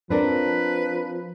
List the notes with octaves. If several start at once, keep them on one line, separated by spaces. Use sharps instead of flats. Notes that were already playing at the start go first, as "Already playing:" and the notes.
F3 C4 D4 A#4 B4